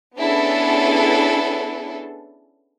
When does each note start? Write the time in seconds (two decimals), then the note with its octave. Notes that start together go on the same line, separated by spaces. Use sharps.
0.18 B3 C#4 D4 E4 G#4 A4